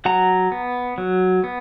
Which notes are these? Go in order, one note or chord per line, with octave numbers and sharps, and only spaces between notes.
F#3 F#5 A#5
B3
F#3
B3